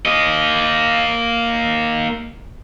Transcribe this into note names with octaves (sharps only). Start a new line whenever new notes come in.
A#3 D#5